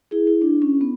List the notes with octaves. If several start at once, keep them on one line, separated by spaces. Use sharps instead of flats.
E4 G#4
E4
D4
C#4
B3